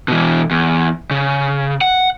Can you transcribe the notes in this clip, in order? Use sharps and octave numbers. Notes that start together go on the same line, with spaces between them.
B2 E3
E2
C#3
F#5